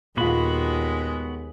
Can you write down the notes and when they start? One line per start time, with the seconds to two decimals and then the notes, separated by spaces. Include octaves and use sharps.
0.17 D#2 A#2 G#3 B3 F4 F#4 B5